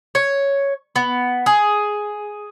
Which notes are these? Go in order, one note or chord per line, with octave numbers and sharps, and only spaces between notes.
C#5
B3
G#4